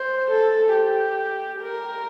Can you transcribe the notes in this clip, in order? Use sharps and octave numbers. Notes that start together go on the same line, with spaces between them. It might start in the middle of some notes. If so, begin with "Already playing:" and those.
Already playing: C5
A4
G4
A#4